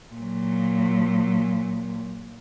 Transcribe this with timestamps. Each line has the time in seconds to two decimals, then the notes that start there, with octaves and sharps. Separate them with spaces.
0.14 A#2 F#3